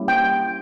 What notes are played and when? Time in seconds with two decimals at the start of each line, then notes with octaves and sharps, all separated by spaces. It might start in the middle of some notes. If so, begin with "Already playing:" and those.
Already playing: G3 A#3 C#4 E4 G4
0.08 G5